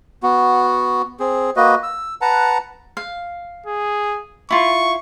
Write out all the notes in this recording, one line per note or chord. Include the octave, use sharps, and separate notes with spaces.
B3 F#4
C4 G#4
A#3 F#4 B4 D#5
E6
B4 F#5 A5 A#5
F5
G#4
E4 F4 C#6